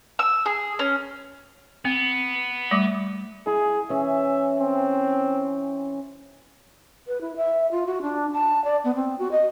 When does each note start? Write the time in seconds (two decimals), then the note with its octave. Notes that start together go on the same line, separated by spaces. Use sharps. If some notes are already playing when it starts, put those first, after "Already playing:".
0.19 E6
0.46 G#4
0.79 C#4
1.85 B3 C4
2.71 G3 A3 D6
3.47 E4 G#4
3.90 E3 C#4 E5
4.60 C4
7.07 B4
7.21 E4
7.37 E5
7.71 F4
7.86 F#4
8.02 D4
8.33 A5
8.64 D5
8.84 B3
8.95 C4
9.19 F#4
9.31 D#5